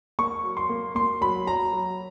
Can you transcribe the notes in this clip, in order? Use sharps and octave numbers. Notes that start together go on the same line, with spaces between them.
A#3 C#6
F#3
C6
A#3
A#3 C6
F#3 B5
F#3 A#5
F#3